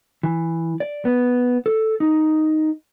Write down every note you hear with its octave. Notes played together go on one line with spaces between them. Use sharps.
E3
D5
B3
A4
D#4